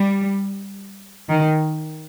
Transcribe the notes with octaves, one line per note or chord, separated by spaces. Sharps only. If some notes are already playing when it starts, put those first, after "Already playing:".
Already playing: G3
D#3